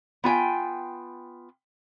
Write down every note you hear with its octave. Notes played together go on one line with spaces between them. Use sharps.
B3 F4 G5 G#5